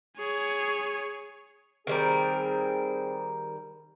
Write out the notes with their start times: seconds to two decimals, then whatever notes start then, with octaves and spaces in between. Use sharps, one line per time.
0.17 G#4 C#5
1.87 D#3 G3 C4 G#4 A#4